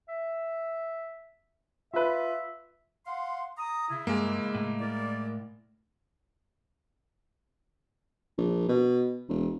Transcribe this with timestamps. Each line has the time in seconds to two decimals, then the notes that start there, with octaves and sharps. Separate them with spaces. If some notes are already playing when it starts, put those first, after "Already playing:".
0.09 E5
1.94 F4 B4 E5
3.05 F5 F#5 C6
3.57 A#5 D#6
3.89 C#3 E4
4.07 G2 G#3 A#3
4.55 A2
4.79 E4 A#4 D5
8.37 A#1
8.69 B2
9.29 E1